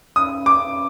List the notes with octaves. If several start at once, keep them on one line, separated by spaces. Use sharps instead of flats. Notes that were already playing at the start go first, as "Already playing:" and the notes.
D#6
D6